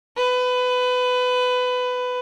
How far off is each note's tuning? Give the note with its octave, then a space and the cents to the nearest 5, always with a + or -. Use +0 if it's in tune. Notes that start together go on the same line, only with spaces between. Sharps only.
B4 +20